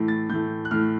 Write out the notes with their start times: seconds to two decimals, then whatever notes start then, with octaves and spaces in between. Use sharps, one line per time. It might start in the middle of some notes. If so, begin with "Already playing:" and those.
Already playing: A2 E3 A3
0.08 A6
0.29 A2 E3 A3 G6
0.65 F#6
0.71 A2 E3 A3 F6